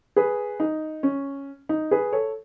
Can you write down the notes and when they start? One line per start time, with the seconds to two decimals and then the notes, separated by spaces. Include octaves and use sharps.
0.16 G#4 B4
0.60 D#4
1.03 C#4
1.69 D#4
1.91 G#4 B4
2.12 A4 C#5